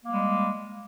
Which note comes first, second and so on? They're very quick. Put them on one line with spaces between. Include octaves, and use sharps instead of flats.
A#3 G3 G#3